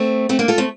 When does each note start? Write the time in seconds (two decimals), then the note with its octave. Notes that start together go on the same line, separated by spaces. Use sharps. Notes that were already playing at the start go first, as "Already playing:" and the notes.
Already playing: A3 C4
0.29 A3 C4
0.39 A#3 D4
0.48 F4 A4
0.58 A3 C4